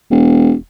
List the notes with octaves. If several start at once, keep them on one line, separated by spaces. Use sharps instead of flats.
E1